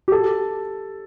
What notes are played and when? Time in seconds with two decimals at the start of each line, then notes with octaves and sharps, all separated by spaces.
0.08 G4
0.12 A4